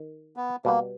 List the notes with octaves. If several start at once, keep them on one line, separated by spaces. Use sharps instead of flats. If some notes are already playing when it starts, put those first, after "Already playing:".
Already playing: D#3
B3
B2 G3 A#3 B3